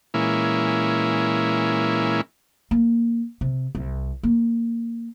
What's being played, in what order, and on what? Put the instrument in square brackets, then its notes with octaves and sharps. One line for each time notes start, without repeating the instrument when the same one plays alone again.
[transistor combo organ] A#2 E3 G#3 A#3 C#4 E4
[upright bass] A#3
C3
C2
A#3